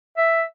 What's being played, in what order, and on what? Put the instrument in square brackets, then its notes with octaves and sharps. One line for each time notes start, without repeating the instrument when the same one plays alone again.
[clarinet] E5